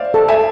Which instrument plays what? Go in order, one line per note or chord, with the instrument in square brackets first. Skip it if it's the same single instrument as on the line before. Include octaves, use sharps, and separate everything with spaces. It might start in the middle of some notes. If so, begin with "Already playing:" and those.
Already playing: [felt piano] C5 D5 E5 F5
[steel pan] A4
[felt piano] E5 G#5